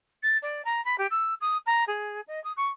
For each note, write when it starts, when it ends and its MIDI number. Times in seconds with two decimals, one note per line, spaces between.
0.23 0.38 93
0.43 0.62 74
0.65 0.83 82
0.85 0.96 83
0.98 1.07 67
1.11 1.34 88
1.41 1.58 87
1.66 1.84 82
1.87 2.21 68
2.28 2.42 75
2.44 2.52 87
2.57 2.69 85